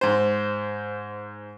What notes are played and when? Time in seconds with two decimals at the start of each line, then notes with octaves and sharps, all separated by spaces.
0.01 G#2 C5